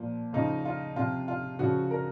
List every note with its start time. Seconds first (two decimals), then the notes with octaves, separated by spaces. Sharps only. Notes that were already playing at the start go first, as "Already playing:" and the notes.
Already playing: A#2 F3
0.33 C#3 F3 D#4
0.65 F4
0.96 C3 F3 F4
1.28 F4
1.59 C#3 F3 F#4
1.91 A#4